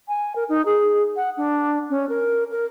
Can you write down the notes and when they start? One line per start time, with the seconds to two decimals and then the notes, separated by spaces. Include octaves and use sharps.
0.08 G#5
0.36 A#4
0.49 D#4
0.65 G#4
1.16 F#5
1.37 D4
1.90 C#4
2.09 A#4
2.51 A#4